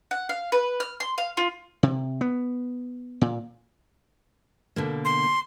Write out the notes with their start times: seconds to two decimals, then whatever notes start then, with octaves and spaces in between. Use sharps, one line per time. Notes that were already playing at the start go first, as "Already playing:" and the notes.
0.11 F#5
0.29 F5
0.52 B4
0.80 F6
1.00 C6
1.18 F5
1.37 F4
1.83 C3
2.21 B3
3.21 A#2
4.76 B2 D3 A#3
5.05 C6